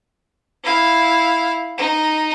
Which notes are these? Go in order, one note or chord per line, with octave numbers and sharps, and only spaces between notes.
E4 F5
D#4